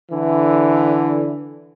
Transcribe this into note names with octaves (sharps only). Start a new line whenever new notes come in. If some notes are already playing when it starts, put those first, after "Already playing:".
D3 E3